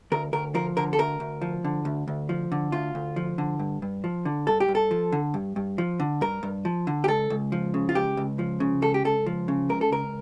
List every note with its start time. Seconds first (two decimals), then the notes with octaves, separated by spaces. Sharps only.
0.12 D2 A#4
0.33 D2 A#4
0.55 F3 A#4
0.77 D3 A#4
0.93 A4
0.99 D2 A#4
1.20 D2
1.41 F3
1.64 D3
1.85 D2
2.08 D2
2.29 F3
2.52 D3
2.72 D2 F4
2.95 D2
3.16 F3
3.38 D3
3.59 G2
3.82 G2
4.04 F3
4.25 D3
4.47 G2 A4
4.60 G4
4.68 G2
4.75 A4
4.91 F3
5.12 D3
5.34 G2
5.56 G2
5.78 F3
6.00 D3
6.21 G2 A#4
6.43 G2
6.65 F3
6.87 D3
7.04 G4
7.08 C#2 A4
7.30 C#2
7.52 F3
7.74 C#3
7.89 F4
7.95 C#2 G4
8.17 C#2
8.39 F3
8.60 C#3
8.82 C#2 A4
8.94 G4
9.05 C#2 A4
9.26 F3
9.48 C#3
9.69 C#2 A#4
9.81 A4
9.92 C#2 A#4